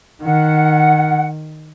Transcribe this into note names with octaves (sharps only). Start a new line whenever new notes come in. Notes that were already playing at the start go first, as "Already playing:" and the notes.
D#3 F#5